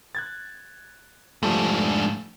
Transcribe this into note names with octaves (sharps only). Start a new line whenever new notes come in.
F#6 G#6 A6
G#2 F3 G3 A3 D4